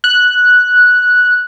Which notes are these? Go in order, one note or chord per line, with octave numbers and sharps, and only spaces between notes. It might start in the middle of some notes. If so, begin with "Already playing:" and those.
F#6